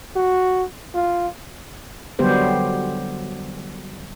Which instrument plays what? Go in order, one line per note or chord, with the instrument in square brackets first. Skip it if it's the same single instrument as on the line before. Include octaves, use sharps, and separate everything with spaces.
[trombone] F#4
F4
[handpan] D3 F#3 G3 B3 G4 C5